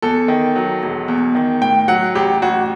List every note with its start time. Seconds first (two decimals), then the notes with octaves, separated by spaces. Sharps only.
0.02 E2 A4
0.28 D#3
0.56 F#3
0.83 E1
1.08 E2
1.35 D#3
1.61 A2 G5
1.88 F#3 F#5
2.15 A1 G4
2.42 A1 F#4